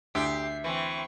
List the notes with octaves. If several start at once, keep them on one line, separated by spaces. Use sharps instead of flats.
D2 G4 E5 C7
E3 C4 C#6